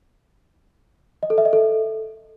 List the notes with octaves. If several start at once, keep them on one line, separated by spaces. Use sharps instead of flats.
D#5
A4
E5
D#5
A4